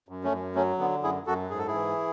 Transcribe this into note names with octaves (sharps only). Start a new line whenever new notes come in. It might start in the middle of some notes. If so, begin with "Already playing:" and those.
F#2
A3 C#4
F#2
F#3 A3 C#4
D3 B3
F#2 E4 G#4
F#2 F#4 A4
G#2 G#4
A4
E4 G#4
E3